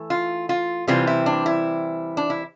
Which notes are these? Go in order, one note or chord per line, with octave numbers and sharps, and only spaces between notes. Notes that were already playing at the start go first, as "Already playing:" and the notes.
Already playing: E3 A3
F4
F4
C3 E3 G3 C4 F4
E4
D4
E4
D4
E4